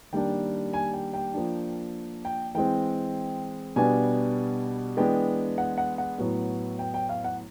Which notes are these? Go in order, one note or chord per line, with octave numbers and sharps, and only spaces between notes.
D#3 G3 A#3 D4 G5
G#5
G5
G5
F3 A#3 D4
G5
E3 G#3 C4 G5
B2 G3 B3 D4 G#5
E3 G#3 B3 D4 G5
F#5
F#5
F#5
A2 F#3 B3
G5
G5
F5
F#5